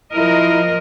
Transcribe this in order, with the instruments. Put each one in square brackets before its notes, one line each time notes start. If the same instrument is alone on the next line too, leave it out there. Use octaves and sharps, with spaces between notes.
[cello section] F3 A#4 D#5 [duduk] E4